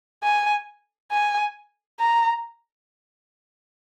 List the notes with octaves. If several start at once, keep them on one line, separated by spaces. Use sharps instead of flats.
G#5
G#5
A#5